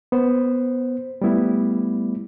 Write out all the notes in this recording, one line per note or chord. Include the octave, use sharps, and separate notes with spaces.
B3 C5
G3 A3 B3 E4